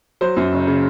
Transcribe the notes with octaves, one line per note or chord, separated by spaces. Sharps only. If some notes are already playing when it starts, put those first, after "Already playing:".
F#3 C5
F#2
F#1
C#3